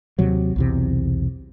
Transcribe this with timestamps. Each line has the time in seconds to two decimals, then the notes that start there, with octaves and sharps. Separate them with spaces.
0.19 D#2 C3 F#3
0.56 B1 E2 C3